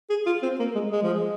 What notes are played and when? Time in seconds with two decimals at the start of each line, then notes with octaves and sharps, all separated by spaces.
0.10 G#4
0.26 F4
0.43 C4
0.59 A#3
0.75 G#3
0.92 G#3
1.02 F3
1.13 G#3